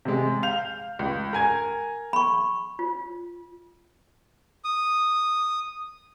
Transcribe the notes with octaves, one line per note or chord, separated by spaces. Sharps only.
C3 G#3
F5 G6 F7
C#2
A#4 G#5 G#6
B5 C#6
F4
D#6